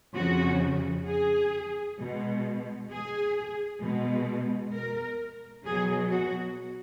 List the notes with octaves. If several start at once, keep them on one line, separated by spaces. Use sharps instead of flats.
F2 C#3 F3 F#4
G#4
B2 G#3
G#4
B2 G#3
A#4
B2 F#3 G#4
F#4